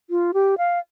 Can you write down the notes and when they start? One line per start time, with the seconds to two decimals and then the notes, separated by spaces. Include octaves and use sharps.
0.10 F4
0.34 G4
0.58 F5